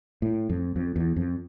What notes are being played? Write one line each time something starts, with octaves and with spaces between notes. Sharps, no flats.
A2
F2
F2
E2
F2